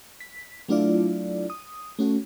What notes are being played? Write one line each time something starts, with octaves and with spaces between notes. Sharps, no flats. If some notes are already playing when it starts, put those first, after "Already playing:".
B6
F#3 A3 D4 E4 F4 D5
D#6
A3 C#4 F#4